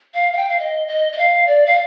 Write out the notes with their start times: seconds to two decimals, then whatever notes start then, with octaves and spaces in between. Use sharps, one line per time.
0.14 F5
0.33 F5
0.37 G5
0.49 F5
0.59 D#5
0.88 D#5
1.12 D#5
1.18 F5
1.47 D5
1.66 F5